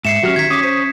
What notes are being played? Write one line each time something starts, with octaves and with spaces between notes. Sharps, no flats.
G#2 E5 C7 C#7 E7
F#3 C#4 F#4 G4 F6
D#3 G#6 B6
C#4 D6 D#6
C5